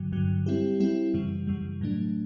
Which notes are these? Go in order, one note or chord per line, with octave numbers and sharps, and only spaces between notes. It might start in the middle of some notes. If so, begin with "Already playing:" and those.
Already playing: G2 D3 F#3
G2 D3 F#3
G3 C4 E4 G4
G3 C4 E4 G4
F#2 C#3 E3 G3
F#2 C#3 E3 G3
A2 F#3 A3 D4